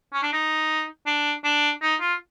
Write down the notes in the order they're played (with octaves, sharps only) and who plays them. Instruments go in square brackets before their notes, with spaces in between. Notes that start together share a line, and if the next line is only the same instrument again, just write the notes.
[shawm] C#4
D4
D#4
D4
D4
D#4
F4